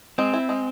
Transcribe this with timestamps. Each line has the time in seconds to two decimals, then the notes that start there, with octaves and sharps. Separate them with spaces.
0.18 G#3 C4
0.34 E4
0.49 G#3